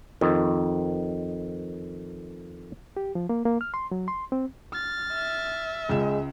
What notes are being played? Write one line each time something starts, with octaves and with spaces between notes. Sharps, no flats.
F2 D#3
G4
F3
A#3
A#3
F6
C6
F#3
C6
C4
F6 A6
E5
C#2 C#3 G#3 E7